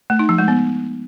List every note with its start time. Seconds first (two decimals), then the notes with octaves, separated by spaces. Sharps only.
0.10 A3
0.19 D#4
0.29 F3
0.38 G#3
0.48 B3